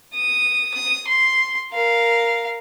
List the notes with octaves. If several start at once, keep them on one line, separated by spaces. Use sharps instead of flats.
D#6
D#6
C6
A#4 F5